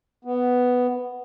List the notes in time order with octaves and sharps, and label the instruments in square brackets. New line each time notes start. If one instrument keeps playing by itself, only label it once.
[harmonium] B3